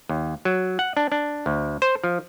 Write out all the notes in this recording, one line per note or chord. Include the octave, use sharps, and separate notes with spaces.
D#2
F#3
F#5
D4
D4
D2
C5
F3